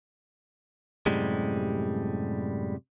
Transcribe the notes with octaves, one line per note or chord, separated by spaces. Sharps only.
F#2 A2 C3 G3 G#3